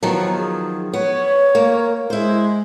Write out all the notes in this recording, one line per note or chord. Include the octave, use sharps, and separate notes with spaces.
D#3 F3 F#3 B3
G#4
B3 C#5
A#3
G#3 E4 C5